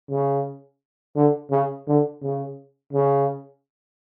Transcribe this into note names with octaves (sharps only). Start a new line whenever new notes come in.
C#3
D3
C#3
D3
C#3
C#3